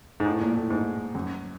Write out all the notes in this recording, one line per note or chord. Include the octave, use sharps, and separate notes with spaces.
G#2
A2
A#2
A2
G#2
F#2